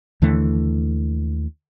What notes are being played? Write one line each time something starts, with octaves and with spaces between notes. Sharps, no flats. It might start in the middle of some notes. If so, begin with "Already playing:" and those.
D#2 D3 E3 A3